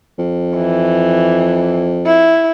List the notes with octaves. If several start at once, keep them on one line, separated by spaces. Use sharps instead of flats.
F2
E3
E4